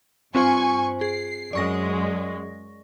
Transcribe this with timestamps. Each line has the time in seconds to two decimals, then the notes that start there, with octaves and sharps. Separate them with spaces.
0.35 G2 C4 F4 C5 G#5 C#6
1.01 G#4 C7
1.53 F#2 G#3 D5 C#6 A#6